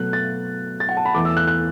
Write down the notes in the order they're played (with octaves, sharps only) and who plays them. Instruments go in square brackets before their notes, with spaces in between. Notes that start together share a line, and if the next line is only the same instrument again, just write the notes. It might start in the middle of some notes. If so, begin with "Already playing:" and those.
Already playing: [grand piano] B2 F#3 A3 F#6
A6
A6
F#5
A5
B5
E2 E3 A3 D6
E6
F#6
F#6